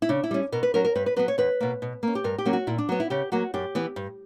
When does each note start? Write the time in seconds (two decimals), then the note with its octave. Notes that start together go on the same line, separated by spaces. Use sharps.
0.02 E4
0.09 C#3 D4
0.24 E4
0.31 G3 C#4
0.52 B2 A#4
0.63 B4
0.74 F#3 C#4 A#4
0.85 A#4
0.95 G2 B4
1.06 B4
1.16 F#3 B3 B4
1.28 C#5
1.38 E2 B4
1.60 B2 A#3
1.82 B2
2.03 A#3 C#4
2.15 G4
2.24 G2 A#4
2.38 G4
2.45 F#3 A#3 C#4
2.53 F#4
2.67 A#2 E4
2.78 D4
2.89 F#3 B3
3.00 E4
3.10 C#3 G4
3.32 F#3 A#3 F#4
3.54 F#2 G4
3.75 E3 B3
3.96 G2